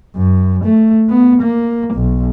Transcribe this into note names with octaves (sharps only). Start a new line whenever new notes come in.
F#2
A3
B3
A#3
B1